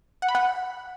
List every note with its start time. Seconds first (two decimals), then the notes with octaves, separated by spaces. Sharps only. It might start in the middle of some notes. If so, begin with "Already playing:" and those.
0.22 F#5
0.29 B5
0.35 F#5